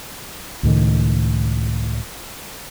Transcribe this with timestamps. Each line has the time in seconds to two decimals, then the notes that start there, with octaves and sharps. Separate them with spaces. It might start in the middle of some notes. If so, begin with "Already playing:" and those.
0.63 C#2 A2 D#3